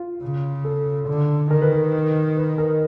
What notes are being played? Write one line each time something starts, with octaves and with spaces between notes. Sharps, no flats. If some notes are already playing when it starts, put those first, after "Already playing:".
Already playing: F4
C#3
A4
D3
D#3 A#4
B4
A#4
B4
A#4